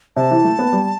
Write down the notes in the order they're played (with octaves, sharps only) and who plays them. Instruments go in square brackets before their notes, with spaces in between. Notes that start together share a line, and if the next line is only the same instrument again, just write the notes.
[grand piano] C3 [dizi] A5
[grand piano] E3
A3
B3
G3